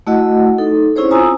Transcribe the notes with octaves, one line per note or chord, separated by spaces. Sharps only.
A3 E4 F#4 D#5 F#5
D#4 A4
C4 C#4 E4 G#4 C5 C#5
F4 G#5 A#5 D#6 E6